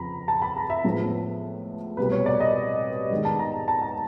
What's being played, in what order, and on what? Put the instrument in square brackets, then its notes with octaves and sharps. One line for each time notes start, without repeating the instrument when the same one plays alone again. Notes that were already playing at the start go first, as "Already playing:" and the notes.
Already playing: [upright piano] F2 C#3 F3 A#5 B5
A5
B5
A#5
E5
A2 F3 G#3 B3
C2 B2 G3 B4
C#5
D5
D#5
G#2 D#3 G#3 B3
A5
A#5
A5
A#5